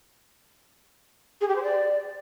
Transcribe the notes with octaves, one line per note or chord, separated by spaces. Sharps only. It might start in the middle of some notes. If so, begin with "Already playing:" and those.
G#4
G4
C5
D5